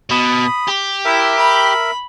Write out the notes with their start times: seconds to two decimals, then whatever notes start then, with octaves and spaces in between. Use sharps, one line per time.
0.11 B2 B5 D#6
0.68 G4
1.05 E4 A#4 E5
1.38 B5